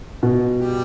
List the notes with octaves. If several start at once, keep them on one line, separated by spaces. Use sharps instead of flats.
B2
G3 G4